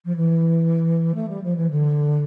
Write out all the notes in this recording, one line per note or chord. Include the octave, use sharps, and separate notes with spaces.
F3
E3
A3
G3
F3
E3
D3